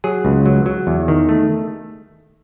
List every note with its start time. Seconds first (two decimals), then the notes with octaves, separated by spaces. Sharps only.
0.04 F#3 G#4
0.25 C#2
0.46 F#3
0.66 F#3
0.87 E2
1.08 D#3
1.29 A3